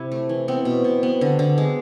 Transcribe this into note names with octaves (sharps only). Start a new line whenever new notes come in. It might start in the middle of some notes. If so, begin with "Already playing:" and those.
Already playing: C3 E4
A3
E3
B3 C4
B2
B2
B3
D3
D3
G#3